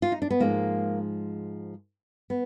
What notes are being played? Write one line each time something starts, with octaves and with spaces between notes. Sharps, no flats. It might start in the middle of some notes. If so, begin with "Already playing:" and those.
F4
D#4
D4
B3
G#2 F3 G#3 A#3
B3